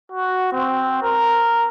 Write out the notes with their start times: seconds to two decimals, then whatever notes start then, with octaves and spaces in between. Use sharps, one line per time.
0.12 F#4
0.53 C4
1.03 A#4